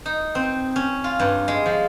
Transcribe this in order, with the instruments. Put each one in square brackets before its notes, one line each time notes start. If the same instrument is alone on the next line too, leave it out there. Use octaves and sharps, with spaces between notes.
[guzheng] D#4
C4
C#4
F4
G2
G#3
F3